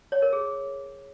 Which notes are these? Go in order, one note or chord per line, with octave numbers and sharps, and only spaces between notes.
C#5
A#4
G#4